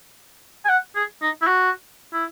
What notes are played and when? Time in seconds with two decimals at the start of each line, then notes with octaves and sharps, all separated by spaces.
0.65 G#5
0.69 F#5
0.96 G#4
1.22 D#4
1.42 E4
1.47 F#4
2.13 E4